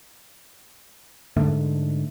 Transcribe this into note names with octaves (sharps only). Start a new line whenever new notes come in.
G#2 D3 A3